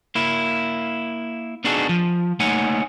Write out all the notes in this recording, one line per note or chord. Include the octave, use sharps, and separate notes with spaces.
A#3 E4
B3 D4 D#4 F#4 G#4 A4
F3
A3 A#3 D#4 C#5 F#5 G#5